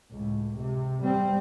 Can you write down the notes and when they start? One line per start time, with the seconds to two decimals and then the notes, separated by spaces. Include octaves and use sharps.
0.12 C#2 A2
0.58 C3
1.03 G3 C4